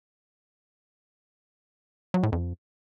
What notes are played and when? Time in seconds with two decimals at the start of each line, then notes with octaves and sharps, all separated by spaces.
2.14 F#3
2.23 A2
2.32 F2